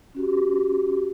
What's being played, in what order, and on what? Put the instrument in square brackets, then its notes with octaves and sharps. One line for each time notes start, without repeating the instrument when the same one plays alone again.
[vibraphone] C#4 F#4 G4